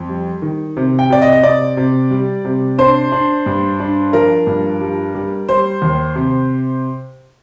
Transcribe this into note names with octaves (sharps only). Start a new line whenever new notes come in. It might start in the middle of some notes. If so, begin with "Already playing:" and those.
Already playing: F2
G3
D#3
C3
G5
C3 D5
D#5
D#5
C3 D5
C3
G3
C3
D4 C5
D4
G2
D4
F3 A#4
G2
G3
G3
G3 C5
D#2
C3